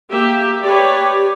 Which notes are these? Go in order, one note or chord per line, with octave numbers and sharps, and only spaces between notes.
A#3 G4 E5
G4 B4 C#5 D5